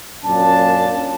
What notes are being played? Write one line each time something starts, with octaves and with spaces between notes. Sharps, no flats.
F#2 A#2 C#4 D4 A5